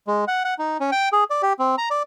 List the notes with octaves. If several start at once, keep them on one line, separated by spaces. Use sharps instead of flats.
G#3
F#5
F#5
D#4
C#4
G5
G#4
D5
G4
C4
A#5
D5